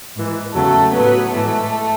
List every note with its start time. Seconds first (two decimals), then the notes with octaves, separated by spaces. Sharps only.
0.15 G#2 E3
0.53 E2 C#3 F#3 A3 A4
0.93 A2 F#3 B3 B4
1.32 G#2 E3 A3 A4